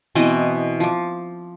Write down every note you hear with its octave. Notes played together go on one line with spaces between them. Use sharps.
B2 E3 C4 D#5
F3 D6